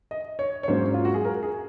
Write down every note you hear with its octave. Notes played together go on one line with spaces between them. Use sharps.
D#5
C#5
C#5
G#2 F#3 A#3 C#4 C5
F4
F#4
G#4
A#4
G#4